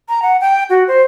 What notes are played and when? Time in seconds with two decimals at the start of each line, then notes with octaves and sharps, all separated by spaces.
0.09 A#5
0.22 F#5
0.41 G5
0.70 F#4
0.88 C5